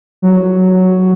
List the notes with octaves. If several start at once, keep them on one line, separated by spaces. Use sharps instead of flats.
F#3